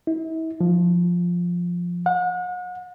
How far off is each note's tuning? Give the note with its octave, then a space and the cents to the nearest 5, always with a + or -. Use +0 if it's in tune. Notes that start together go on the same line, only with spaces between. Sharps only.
E4 -40
F3 +5
F#5 -40